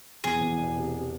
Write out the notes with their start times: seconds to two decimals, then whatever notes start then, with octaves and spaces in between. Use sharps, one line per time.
0.24 E2 G#4
0.41 E2
0.58 E1
0.76 C3
0.93 C3